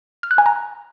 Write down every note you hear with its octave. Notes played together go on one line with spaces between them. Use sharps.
F6
F#6
G#5
A#5